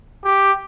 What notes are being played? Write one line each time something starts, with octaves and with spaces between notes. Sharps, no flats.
G4